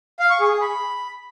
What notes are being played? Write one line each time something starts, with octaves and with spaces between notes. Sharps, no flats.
F5
C#6
G#4
G#4
B5